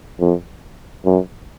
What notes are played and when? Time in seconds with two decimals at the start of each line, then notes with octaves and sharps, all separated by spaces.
0.20 F2
1.05 F#2